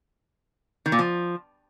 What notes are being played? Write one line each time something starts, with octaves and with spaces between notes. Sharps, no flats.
D#3
A#2
F3